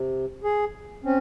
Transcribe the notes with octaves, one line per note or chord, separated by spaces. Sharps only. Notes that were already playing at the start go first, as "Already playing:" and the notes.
Already playing: C3
G#4
C4 C#4